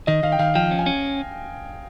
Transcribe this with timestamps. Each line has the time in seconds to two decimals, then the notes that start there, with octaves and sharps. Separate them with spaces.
0.07 D#3 D#5
0.23 D#3 F5
0.32 G5
0.39 D#3 F5
0.55 F3 G5
0.71 C#4
0.79 G#5
0.86 C#4